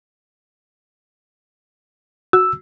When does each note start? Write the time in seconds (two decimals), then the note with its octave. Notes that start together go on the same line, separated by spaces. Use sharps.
2.33 F#4 E6